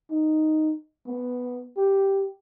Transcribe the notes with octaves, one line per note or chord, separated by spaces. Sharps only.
D#4
B3
G4